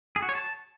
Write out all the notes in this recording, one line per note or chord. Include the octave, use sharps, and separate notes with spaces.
G#4
F#4
C#5
A5